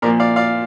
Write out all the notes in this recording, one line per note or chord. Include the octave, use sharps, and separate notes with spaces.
A#2 F3 A#3 A#4 D5
D5 F5
D5 F5